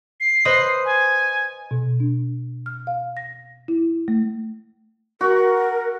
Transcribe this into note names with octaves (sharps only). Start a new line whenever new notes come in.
C7
B4 C5 D#5
G#5
B2
D4
F6
F5
A#6
E4
A3
F#4 A#4